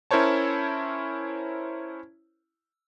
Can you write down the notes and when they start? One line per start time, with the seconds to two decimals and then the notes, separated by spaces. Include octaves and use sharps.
0.11 C#4 E4 A#4 C5 C#5 A5